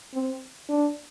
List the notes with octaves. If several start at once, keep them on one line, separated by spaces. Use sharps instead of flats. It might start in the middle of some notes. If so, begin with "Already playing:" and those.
C4
D4